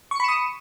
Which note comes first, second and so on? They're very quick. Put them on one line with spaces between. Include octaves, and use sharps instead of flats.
C#6 C#7 B5 E7 D#6